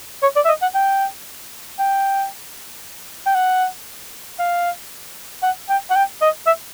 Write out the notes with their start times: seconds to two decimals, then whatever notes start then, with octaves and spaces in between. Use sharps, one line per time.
0.22 C#5
0.36 D5
0.45 E5
0.48 D#5
0.62 F#5
0.75 G5
1.79 G5
3.27 G5
3.35 F#5
4.39 F5
5.43 F#5
5.69 G5
5.90 F#5
5.96 G5
6.21 D#5
6.47 E5